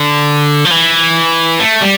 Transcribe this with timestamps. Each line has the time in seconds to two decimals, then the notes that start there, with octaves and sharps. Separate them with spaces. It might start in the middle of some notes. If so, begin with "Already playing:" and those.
Already playing: D3
0.65 F3
0.71 E3
1.60 A3
1.82 G3